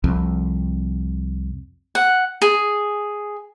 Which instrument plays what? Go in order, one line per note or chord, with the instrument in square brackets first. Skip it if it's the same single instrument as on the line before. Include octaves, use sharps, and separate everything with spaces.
[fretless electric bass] C2 F2
[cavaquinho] F#5
G#4